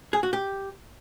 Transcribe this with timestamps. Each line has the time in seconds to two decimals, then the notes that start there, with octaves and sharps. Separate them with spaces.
0.13 G#4
0.23 F#4
0.33 G4